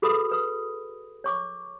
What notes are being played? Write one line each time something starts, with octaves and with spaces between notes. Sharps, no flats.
F#4 G#4 A4 B4 B5 D#6
B4 D#6
C#5 C#6 D6